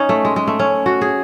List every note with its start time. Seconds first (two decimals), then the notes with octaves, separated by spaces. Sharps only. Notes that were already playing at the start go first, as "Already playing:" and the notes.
Already playing: C#4 D#4
0.09 A3
0.25 G#3
0.36 G#3
0.47 A3
0.59 C#4
0.86 F#4
1.01 G#4